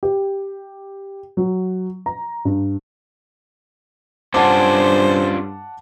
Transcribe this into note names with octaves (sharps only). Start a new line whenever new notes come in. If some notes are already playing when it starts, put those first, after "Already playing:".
G4
F#3
A#5
G2
G2 C#4 D4 F4 C5 F#5 A5 D6